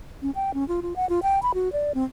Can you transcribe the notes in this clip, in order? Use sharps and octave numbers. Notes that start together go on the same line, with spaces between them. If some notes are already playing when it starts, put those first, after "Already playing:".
C#4
G5
C#4
F4
F4
F#5
F4
G5
B5
F#4
D5
C4